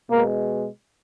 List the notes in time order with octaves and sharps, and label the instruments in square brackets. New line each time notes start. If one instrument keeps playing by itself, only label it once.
[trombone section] B2 G#3 A#3